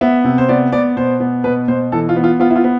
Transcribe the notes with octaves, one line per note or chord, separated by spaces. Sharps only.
B3 E5
C3
C5
B3 D5
B3 D5
B2 C5
B3
B2 B4
B2 C5
E3 A4
F4
B3
F4
B3 F4
E4
F4
B3